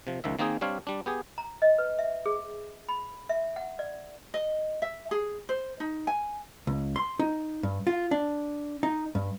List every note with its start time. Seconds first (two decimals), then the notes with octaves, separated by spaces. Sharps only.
0.07 C3 F3
0.24 C#2 D#3 F3 E5
0.39 D#3 A#3 C4 D#4 G#4
0.61 G3 C4 D4 C#5 F5
0.87 G3 D4
1.06 B3 G4 G#4
1.38 A#5
1.62 D#5
1.78 B4
1.99 E5
2.26 G#4
2.89 B5
3.29 E5
3.56 F#5
3.79 D5
4.34 D#5
4.82 E5
5.11 G#4
5.49 C5
5.80 D#4
6.07 G#5
6.67 C#2
6.96 C6
7.19 D#4
7.63 G2
7.87 F4
8.11 D4
8.83 D#4
9.15 G2